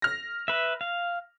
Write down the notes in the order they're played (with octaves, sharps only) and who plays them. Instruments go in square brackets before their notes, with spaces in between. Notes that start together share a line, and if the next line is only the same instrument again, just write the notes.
[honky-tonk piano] F6 A#6
[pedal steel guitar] B4 E5
F5